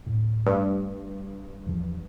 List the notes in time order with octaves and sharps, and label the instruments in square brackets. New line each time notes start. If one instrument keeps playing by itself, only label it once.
[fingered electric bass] D1 A2
[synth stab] G2 [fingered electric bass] A3
[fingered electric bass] E2 E3 F3